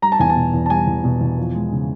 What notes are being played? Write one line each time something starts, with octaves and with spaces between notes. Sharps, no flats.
G3 A#5
A5
E2 G#5
A5
B2
E2
A5
G3 G#5
E2
B2
E2
F3
G#3
C#3